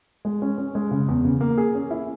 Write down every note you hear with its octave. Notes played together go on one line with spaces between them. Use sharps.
G#3
C#4
C#4
G#3
C#3
E2
C#3
A#3
G#4
C#4
E4